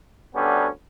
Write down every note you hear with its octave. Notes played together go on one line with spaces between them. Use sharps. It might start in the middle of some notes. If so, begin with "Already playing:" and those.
D2 D3 G3 B3 C#4